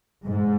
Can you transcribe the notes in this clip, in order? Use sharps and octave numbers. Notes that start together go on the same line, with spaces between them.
G#2